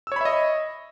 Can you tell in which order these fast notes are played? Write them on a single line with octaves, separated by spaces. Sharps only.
E6 C#5 B5 E5 D#5